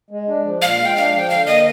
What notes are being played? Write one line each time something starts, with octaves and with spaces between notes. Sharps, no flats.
G#3
D4
F3
A#2 F5
G#3
G5
D4 F5
F3
G5
D3 F5
A#3 D#5